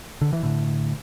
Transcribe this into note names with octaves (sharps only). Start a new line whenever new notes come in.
D3
E3
A2 D3